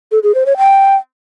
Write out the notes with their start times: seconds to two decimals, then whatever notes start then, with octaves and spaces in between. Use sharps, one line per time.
0.12 A4
0.23 G#4
0.35 C5
0.46 C#5
0.57 G5